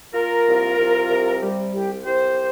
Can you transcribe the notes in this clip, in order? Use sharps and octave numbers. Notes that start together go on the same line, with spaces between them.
A#3 F4 A#4
C2
C2
C3
G3 G4
C2 G4
C2 G4 C5